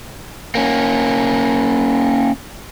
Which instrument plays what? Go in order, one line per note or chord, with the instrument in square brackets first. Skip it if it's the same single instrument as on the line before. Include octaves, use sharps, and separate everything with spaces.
[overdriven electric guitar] A#3 C#4